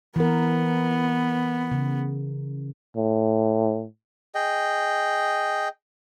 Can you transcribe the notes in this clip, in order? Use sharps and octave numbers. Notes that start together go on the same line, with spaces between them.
E3 B3 A#4
C#3
A2
G#4 D#5 G5